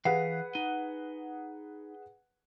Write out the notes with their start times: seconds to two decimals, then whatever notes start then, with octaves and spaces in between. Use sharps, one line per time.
0.05 E3 G#4 B4 F5 F#5
0.55 D#4